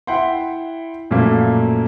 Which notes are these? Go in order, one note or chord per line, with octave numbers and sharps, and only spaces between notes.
E4 E5 F#5 G5 B5 C6
F#2 A#2 F3 A3 A#3